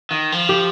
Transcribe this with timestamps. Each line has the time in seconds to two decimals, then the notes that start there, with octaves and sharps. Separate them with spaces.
0.11 D#3
0.32 F3
0.49 G4